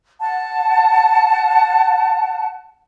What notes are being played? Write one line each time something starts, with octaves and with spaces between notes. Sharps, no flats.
F#5 A5